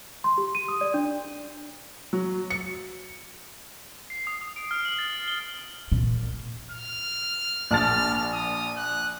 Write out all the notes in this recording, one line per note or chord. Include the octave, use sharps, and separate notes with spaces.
C6
G4
D#7
D#6
D5
D4
F#3
C#7
C7
D#6
D#6
D7
F6
F#7
A6
C7
G7
A#2
F6
A#1 A5 F6 A6
D#6
F#6